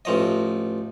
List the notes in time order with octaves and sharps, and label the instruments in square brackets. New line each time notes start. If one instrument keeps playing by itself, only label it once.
[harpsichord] A1 F3 D#5